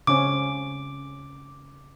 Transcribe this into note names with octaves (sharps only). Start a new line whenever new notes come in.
C#3 C4 C#4 D6